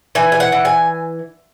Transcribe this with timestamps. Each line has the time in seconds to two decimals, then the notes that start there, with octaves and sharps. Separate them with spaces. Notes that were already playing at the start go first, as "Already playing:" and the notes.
0.15 E3 G#5
0.32 G#5
0.40 F#5
0.52 E3
0.65 G#5